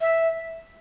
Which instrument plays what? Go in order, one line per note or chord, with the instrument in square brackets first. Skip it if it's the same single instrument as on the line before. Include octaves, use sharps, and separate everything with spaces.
[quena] E5